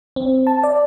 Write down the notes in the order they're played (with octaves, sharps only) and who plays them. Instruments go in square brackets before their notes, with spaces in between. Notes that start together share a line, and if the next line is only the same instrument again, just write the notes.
[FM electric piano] C4
A5
D5